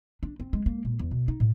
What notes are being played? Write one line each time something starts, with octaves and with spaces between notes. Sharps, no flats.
D4
C4
G#3
A#3
A#2
E2
B2
D#4
A2